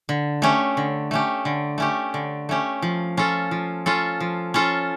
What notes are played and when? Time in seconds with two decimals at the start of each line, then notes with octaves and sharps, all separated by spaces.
0.09 D3
0.42 A3 C#4 G4
0.77 D3
1.11 A3 C#4 G4
1.45 D3
1.78 A3 C#4 G4
2.14 D3
2.49 A3 C#4 G4
2.82 F3
3.17 C#4 F4 A4
3.51 F3
3.86 C#4 F4 A4
4.20 F3
4.54 C#4 F4 A4